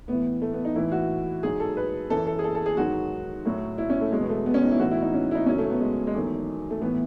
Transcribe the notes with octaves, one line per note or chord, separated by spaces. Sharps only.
A2 E3 B3
A3
B3
D#4
A2 E3 E4
F#4
G#2 F#3 G#4
A4
B4
F#2 E3 A4
A4
G#4
A4
A4
G#4
G#2 D#3 F#3 F#4
A2 F#3
E4
C#4
A3
E2 B2 F#3 G#3
B3
A3
B3
C#4
D#4
E4
A2 E3 F#4
E4
D#4
C#4
E4
D#4
F#2 C#3 F#3 C#4
A3
B3
G#3
G#3
E2 D#3 F#3 A3
A3
A2 E3 B3